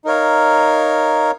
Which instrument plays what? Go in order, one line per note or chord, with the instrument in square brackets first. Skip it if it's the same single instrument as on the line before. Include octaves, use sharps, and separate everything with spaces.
[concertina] D#4 A#4 C#5 F5